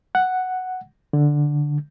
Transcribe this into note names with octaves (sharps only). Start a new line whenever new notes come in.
F#5
D3